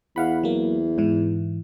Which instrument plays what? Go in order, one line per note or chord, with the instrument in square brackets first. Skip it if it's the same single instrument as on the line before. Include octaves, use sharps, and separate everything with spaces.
[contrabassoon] E2 [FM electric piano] F5 F#5 B5
[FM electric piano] F#3 A#3
G#2 E3